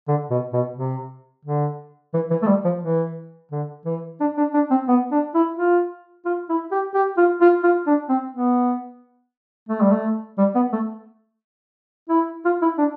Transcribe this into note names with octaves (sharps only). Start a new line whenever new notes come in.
D3
B2
B2
C3
D3
E3
E3
A3
G3
F3
E3
D3
E3
D4
D4
D4
C4
B3
D4
E4
F4
F4
E4
G4
G4
F4
F4
F4
D4
C4
B3
A3
G3
A3
G3
B3
A3
E4
F4
E4
D4